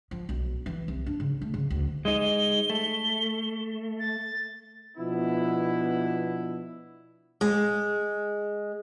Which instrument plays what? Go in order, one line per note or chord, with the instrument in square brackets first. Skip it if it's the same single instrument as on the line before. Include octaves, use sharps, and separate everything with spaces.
[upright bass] F3
B1
E3
C2
D4
C#3
A3
C#3
D2
[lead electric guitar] G#3 D#4 [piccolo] G7
[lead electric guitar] A3
[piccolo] A6
[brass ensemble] B2 F3 B3 D4 E4
[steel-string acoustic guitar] G#3